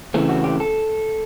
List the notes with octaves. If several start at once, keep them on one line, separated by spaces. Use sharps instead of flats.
C#3 E3 A3 C4
F#4
G4
A4